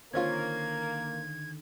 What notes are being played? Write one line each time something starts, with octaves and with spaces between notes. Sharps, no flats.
D3 D#3 A#3 C4 C#4 F4 G#6